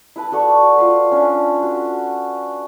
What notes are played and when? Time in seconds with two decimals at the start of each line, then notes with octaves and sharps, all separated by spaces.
0.16 E4 B4 A5
0.32 F#4 A4 D5 C#6
0.78 F4 B4
1.11 C#4 D4
1.63 F#4